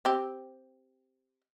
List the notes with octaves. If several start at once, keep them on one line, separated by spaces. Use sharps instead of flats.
C4 G4